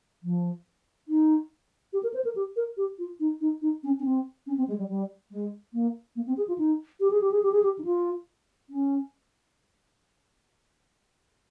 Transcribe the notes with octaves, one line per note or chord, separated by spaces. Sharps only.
F3
D#4
G4
A#4
C5
A#4
G4
A#4
G4
F4
D#4
D#4
D#4
C#4
C#4
C4
C#4
C4
G#3
G3
G3
G#3
A#3
A#3
C4
G#4
F4
D#4
G4
G#4
G4
G#4
G4
G#4
G4
D#4
F4
C#4